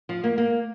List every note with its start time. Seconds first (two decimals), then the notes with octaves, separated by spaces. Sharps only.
0.09 F3
0.24 A#3
0.38 A#3